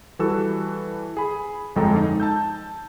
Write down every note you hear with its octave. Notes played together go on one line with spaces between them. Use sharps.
E3 G3 F#4 A4 E6
G#4 B5
G1 F2 G#3 A4 G5 A#5
D#4
A5 E6 G6